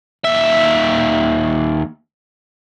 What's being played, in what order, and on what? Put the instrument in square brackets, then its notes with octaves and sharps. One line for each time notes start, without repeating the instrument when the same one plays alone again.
[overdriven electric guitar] D#2 E5